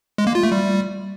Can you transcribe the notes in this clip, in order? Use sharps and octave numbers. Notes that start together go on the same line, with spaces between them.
G#3
A#3
F4
A3
G3